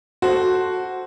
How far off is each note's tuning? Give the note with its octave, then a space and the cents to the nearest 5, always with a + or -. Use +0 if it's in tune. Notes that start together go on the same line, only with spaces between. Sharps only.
F#4 +0 A4 +0 C5 +0